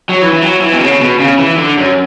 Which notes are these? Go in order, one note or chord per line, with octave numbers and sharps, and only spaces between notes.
F#3
E3
E3
F#3
E3
B2
C#3
B2
C#3
E3
D3
F#2